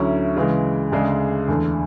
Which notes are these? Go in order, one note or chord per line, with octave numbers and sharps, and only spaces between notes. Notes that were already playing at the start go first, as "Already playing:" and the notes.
Already playing: D2 D3 F#3 C#4 E4
C#3 E3 G#3
D2 C#3 G#3 D4 G#4
E2 D3 A3